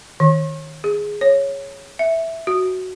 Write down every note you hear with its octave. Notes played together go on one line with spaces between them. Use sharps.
D#3
G#4
C#5
E5
F#4